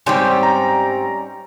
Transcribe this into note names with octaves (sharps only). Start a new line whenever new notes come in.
G#2 G3 C4 C#4 G4
A#5